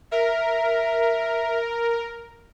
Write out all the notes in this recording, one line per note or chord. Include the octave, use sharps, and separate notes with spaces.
A#4 E5